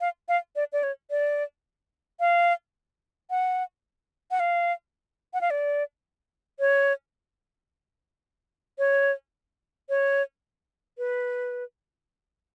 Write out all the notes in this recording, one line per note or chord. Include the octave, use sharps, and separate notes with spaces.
F5
F5
D5
D5
C#5
D5
F5
F#5
F#5
F5
F#5
F5
D5
C#5
C#5
C#5
B4